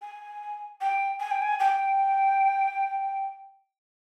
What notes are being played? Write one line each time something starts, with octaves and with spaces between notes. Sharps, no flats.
G#5
G5
G#5
G5
G#5
G5